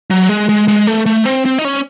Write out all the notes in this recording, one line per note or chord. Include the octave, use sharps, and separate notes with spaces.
F#3
G#3
G#3
G#3
A3
A3
C4
C4
D#4
C#4